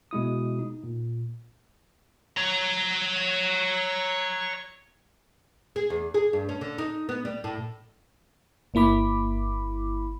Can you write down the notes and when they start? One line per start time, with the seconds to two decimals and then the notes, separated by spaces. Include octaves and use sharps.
0.11 B2 G#3 E4 D#6
0.59 D#4
0.84 A#2
2.37 C#5 A#5
5.76 G#4
5.90 E2
6.14 G#4
6.33 G2
6.49 C#4
6.61 D3
6.78 D#4
7.09 B3
7.25 G3
7.44 A2
8.74 G1 A#3 E4 B5 D6